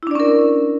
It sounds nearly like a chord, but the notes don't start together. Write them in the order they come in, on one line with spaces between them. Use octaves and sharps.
E4 D4 D5 C#4 A#4